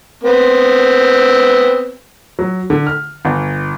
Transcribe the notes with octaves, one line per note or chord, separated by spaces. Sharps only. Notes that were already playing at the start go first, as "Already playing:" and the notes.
B3 C4
F#3
D3
F6
G1